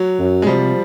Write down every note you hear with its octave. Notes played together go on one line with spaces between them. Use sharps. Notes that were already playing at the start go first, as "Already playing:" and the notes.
Already playing: F#3
F#2
G#3
C3 F3 G3